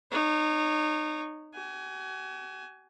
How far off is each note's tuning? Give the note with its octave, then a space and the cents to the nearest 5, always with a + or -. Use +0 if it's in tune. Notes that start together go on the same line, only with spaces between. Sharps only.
D#4 -25 C#5 +0
F#4 +45 G#5 +10